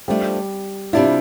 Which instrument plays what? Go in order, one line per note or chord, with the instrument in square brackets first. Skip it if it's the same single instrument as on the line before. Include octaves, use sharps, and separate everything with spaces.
[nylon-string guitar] F3 A3 D4 [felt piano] G3
[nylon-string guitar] C3 G3 D4 F4 [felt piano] E4